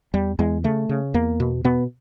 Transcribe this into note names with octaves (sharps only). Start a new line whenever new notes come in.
E2 G3
E2 G#3
C#3 A3
C#3
E2 A#3
B2
B2 B3